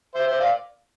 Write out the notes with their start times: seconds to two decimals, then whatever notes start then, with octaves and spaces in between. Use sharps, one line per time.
0.15 C5 E5
0.27 C5 E5
0.40 D5 F5